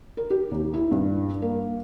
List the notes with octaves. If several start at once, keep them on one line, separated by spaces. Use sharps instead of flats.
A#4
G4
D#2
E4
G2
A#3